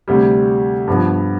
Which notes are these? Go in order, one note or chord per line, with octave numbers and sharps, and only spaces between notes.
D2 C3 G3
G2 F3 B3